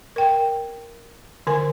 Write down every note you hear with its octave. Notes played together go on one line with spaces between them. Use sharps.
A#4 G5
D3 A#4 G#5